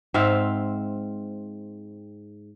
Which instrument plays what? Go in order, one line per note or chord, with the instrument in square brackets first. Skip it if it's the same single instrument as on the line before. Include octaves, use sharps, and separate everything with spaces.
[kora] G#2 C4 E5 F5